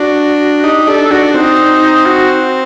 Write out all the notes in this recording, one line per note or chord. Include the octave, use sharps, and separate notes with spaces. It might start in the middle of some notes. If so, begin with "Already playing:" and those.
Already playing: D4 F#4
D#4 G4
D4 A4
D4 F#4
F#4
C4 D#4
F#4